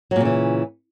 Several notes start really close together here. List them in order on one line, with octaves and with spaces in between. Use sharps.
F#3 A#2 C#3 E3